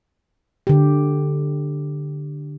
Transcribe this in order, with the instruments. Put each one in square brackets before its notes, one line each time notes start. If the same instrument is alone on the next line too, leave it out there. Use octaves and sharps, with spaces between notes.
[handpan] D3 G4